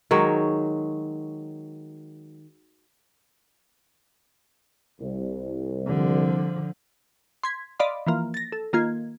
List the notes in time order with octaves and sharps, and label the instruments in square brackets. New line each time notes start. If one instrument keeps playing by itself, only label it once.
[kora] D#3 F#3 G#3 C#5
[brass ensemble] C2
[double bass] D3 F3
[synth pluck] C6 G#6 B6
D5 D#5 F5 B5 C6
E3 F3 A#3
A6 A#6
A4
D#3 A#3 F4 G#6